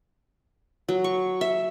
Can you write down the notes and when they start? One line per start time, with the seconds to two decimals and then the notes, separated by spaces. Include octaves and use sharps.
0.88 F#3
1.04 C#6
1.41 E5